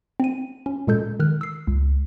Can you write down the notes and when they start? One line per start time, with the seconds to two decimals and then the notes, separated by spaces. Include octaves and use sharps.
0.20 C4 D#7
0.66 C#4
0.87 A#2 G#3 A4 G6
1.20 D#3 F6 F#6
1.41 E6 C7
1.67 C#2